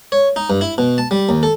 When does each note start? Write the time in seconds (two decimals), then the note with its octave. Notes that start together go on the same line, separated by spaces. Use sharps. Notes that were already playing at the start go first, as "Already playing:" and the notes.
0.12 C#5
0.36 D#4
0.50 G2
0.61 E4
0.78 B2
0.98 A5
1.11 G3
1.29 D#2
1.43 A4